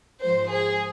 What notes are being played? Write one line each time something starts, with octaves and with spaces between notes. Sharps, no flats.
G#2 F3 C5
G#4